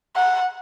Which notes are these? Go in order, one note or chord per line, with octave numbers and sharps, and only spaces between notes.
F#5